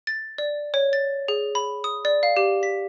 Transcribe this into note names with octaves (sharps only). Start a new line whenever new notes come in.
A6
D5
C#5
A6
G#4
B5
D#6
D5
F5
G4
B6